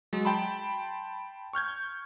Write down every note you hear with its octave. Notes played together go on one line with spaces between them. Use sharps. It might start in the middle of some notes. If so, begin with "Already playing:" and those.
F#3 G#3
G5 A5 B5 C6
C#6 F6 G6 G#6